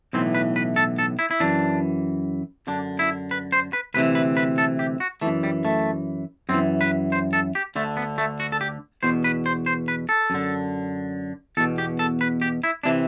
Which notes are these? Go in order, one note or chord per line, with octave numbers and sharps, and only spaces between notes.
B1 A2 E3 C4
B4
B4
A4
A4
E4
E4
F#2 E3 D4
F#2 D3 D4
E4
B4
C5
B4
D2 C3 E3 B4
B4
B4
A4
G4
F#4
F#2 E3 A3
G3
A3
F#2 E3 C4
B4
C5
A4
G4
D2 D3 A3
B3
A3
F#4
A4
G4
E2 B2 C5
B4
C5
C5
B4
A4
F#2 D3
E2 B2 A4
G4
A4
B4
G4
E4
C3 E3 D4